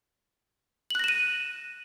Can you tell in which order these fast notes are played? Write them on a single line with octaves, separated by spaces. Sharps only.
F#7 F#6 A#6 E7 D#7